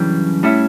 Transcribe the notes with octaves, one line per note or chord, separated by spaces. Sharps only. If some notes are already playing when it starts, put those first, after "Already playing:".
Already playing: F#2 C#3 E3 G3 D4
A2 G3 C#4 E4